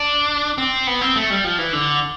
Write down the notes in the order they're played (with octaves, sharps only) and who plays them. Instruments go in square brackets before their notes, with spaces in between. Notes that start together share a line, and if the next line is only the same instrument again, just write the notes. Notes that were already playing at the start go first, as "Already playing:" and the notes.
Already playing: [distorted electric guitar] D4
C4
B3
C4
A3
G3
F3
E3
D3